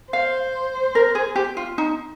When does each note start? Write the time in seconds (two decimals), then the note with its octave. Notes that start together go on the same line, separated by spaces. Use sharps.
0.12 C5 F5
0.95 A#4
1.15 G#4
1.36 G4
1.57 F4
1.78 D#4